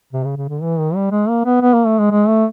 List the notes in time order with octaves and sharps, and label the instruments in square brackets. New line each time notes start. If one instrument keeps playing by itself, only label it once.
[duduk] C3
C#3
C#3
D3
E3
D#3
G3
G#3
A#3
B3
B3
A#3
A3
G#3
G#3
A3